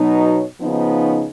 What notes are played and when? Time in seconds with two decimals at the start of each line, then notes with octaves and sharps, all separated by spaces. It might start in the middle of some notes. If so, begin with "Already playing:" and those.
Already playing: B2 F#3 B3 D#4
0.20 C#5
0.60 C#3 F3 B3 D#4
1.02 C#5